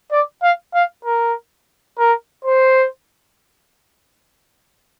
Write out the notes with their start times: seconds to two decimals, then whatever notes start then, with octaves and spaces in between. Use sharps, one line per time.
0.11 D5
0.42 F5
0.74 F5
1.05 A#4
1.98 A#4
2.44 C5